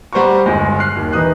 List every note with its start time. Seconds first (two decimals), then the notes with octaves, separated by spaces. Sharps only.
0.13 G3 C5 F#5 A#5 C#6
0.46 G1 G#3
0.79 F6 F#6 C7
0.97 D#2
1.13 D#3 E3 D#4 D#6 F#6